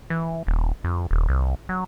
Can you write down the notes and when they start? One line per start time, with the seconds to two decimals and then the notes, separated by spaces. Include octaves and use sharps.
0.10 E3
0.47 D#1
0.84 F2
1.11 D#1
1.29 C2
1.69 F#3